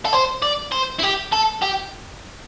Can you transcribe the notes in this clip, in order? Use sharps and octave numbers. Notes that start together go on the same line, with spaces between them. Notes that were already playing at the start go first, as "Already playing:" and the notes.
A4
C5
D5
C5
E4
G4
A4
G4